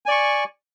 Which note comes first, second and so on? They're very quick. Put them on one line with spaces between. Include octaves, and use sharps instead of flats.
G#5 D5 C#6